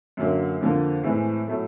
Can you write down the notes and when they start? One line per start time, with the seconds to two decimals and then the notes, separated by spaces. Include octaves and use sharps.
0.17 F#2 D3 F#3 A#3
0.61 F2 D3 F3 A#3
1.03 A2 E3 G#3 C4 E4
1.48 A2 F#3 A3